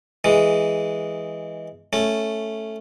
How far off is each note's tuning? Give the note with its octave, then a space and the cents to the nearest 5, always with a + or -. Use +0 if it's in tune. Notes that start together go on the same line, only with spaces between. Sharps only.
E3 +0 G#3 +0
A3 +0 C#4 +0